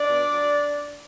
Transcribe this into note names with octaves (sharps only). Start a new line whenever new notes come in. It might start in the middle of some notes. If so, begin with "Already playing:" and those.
Already playing: D4 D5
B2
F#3